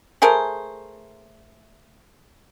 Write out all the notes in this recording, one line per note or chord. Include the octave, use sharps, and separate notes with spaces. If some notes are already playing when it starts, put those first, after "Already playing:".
A3 G#4 A#4 C5